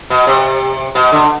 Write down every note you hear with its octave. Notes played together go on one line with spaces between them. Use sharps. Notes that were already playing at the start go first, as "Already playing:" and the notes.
B2
C3
B2
D3